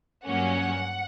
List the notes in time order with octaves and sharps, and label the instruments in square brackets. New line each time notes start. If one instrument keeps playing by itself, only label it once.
[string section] G2 F#3 A#3 C#4 F#5